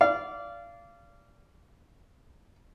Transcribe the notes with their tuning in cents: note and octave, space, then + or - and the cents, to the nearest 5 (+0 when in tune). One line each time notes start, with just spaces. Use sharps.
D5 -20 F5 -25